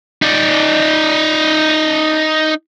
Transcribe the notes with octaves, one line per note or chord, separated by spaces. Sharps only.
D#4 D5